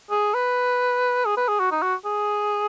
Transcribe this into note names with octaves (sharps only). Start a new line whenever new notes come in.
G#4
B4
G#4
B4
G#4
F#4
D#4
F#4
G#4